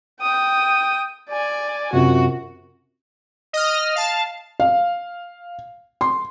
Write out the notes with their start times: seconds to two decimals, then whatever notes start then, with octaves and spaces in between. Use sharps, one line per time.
0.21 G5 D#6
1.30 D5 G#5
1.93 F#2 C3 F4 F#4
3.53 D#5 D#6 F6
3.95 F5 A5
4.60 F5
6.01 C6